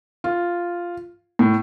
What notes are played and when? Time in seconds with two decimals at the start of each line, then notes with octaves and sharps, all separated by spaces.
0.24 F4
1.39 A2